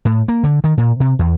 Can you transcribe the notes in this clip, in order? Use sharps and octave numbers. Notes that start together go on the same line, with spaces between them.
A2
A#3
D3
D#3
A#2
C3
E2